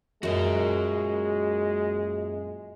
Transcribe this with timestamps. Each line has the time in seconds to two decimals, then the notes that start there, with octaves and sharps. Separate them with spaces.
0.23 F#2 A#2 G#3 F#4 D#5